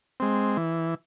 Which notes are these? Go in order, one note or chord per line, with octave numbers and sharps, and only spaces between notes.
G#3 C4
E3